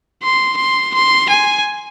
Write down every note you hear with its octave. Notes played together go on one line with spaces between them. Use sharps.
C6
C6
C6
G#5